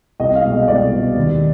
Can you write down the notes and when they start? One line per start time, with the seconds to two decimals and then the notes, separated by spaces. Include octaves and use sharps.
0.20 C2 D#5
0.35 F5
0.44 B2 G#3
0.52 D#5
0.68 C2 D5
0.92 B2 G#3
1.16 D#2